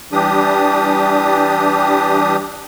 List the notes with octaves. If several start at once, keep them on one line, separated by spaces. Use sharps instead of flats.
E3 G3 D4 G4 D#6